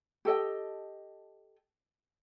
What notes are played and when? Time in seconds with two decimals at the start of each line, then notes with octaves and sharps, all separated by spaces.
0.25 G4 A4 D#5 G5